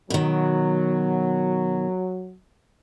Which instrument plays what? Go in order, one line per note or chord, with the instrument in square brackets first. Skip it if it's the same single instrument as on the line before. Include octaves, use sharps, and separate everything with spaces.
[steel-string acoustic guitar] B2 D#3 [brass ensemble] F#3